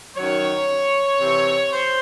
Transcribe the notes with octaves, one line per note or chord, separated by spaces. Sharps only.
F#2 D#3 F#3 C#5
C3 E3
C5